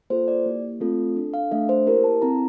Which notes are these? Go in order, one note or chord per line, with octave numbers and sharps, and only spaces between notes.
A#3 F4 A4 C5
D5
A#3 E4 G4
A3 C4 F4 A4
D4 A4
F5
A3 D4 A4 E5
C5
A#3 E4 G4 A#4
A5
C4 E4 A4 A#5